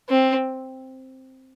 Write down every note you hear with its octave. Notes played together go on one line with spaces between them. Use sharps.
C4